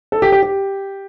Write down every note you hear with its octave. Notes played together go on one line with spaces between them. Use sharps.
A4
G4
G4
G4